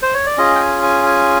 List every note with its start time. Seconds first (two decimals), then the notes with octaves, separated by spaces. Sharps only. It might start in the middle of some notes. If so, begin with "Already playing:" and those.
0.02 C5
0.14 C#5
0.26 D5
0.38 C#4 F4 G#4 D#5
0.55 G5
0.61 G#5
0.83 G#5
1.06 G#5